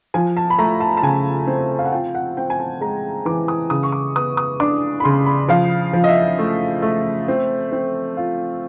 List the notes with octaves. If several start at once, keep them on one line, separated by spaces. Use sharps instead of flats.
F3 G#5
A5
B5
A3 A#5
A5
A5
C#3 G#5
C4
F5
F#5
F4 G5
F#5
C4 G5
G#5
A5
G#3 A#5
E3 D6
D#6
C#3 D#6
C#6
D6
B3 D#6
D#6
D4 D6
B5
C#3 C6
B5
F3 F5
F3
D#5
E5
A3
A3
C4
C4
F4